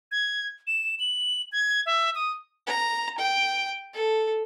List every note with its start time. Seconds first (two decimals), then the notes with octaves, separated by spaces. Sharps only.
0.11 G#6
0.67 E7
0.99 F#7
1.52 G#6
1.86 E5
2.15 D#6
2.67 A#5
3.18 G5
3.94 A4